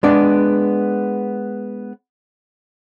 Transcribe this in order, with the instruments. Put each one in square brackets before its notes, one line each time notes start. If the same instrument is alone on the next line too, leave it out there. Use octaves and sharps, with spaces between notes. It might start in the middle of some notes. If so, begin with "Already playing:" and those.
[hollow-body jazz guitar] G#3 B3 D4 D5